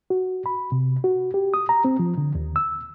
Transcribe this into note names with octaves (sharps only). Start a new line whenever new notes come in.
F#4
B5
C3
F#4
G4
D#6
A#5
C4
F3
D3
D#2
E6